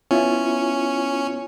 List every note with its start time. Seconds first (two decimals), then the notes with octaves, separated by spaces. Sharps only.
0.11 B3 C#4 E4 F4